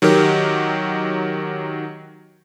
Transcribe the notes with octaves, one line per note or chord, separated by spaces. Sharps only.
D#3 F#3 D#4 G4 A#4